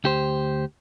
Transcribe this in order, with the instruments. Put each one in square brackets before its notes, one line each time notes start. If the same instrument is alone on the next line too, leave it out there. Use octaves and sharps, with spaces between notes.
[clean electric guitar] D2 G4 C5